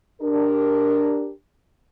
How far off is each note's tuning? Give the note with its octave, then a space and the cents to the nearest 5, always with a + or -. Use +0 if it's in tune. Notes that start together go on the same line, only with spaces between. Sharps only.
D4 +0 G4 +0 A#4 +0